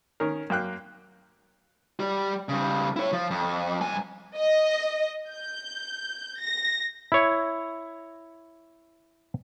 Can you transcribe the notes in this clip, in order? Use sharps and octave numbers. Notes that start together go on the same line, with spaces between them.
D#3 C#4 A#4
F#2 A#3 G5 F#6
G3 G4
C#3 G3
E4 C#5
F3
F2
G2 G#5
D#5
G6
A#6
E4 C#5